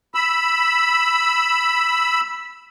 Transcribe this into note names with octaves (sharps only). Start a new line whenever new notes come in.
B5 E6